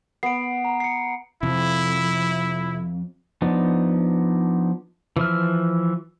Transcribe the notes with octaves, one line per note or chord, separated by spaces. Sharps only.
B3 C7 D7
A#5
C7 C#7
F2 C3 F3 E4
F3 B3 D4 D#4
E3 F3 E5 F6